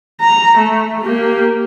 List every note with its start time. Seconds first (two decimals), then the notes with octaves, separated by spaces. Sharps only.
0.21 A#5
0.57 A3
1.02 A#3 G4